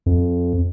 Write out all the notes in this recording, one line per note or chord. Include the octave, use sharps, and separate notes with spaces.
F2